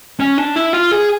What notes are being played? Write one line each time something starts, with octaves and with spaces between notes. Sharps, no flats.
C#4
D4
E4
F4
G#4